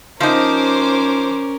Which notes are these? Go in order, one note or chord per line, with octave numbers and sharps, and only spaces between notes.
F3 C#4 D#4 A#4 C5 D6